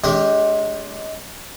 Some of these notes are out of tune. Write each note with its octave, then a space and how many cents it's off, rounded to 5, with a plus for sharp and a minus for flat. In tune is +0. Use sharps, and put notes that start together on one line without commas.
G#3 +25 D4 -40 G4 +0